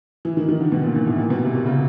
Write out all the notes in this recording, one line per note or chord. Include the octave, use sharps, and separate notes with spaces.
E3
D#3
D#3
D3
B2
A#2
A#2
A2
A#2
B2
C3
A#2
C#3